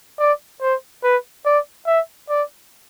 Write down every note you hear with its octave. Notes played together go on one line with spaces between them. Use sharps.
D5
C5
B4
D5
E5
D5